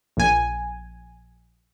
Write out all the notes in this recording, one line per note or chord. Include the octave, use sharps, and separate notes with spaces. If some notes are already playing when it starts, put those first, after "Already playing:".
A#1 G#5